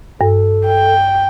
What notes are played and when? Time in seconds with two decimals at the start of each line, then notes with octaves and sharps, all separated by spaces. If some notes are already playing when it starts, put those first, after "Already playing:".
0.21 G2 A4
0.66 G5